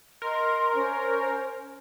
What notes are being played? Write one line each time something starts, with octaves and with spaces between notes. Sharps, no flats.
A#4 D#5 C6
C#4 C5